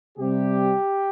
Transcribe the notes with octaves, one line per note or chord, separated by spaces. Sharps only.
C3 G3 G4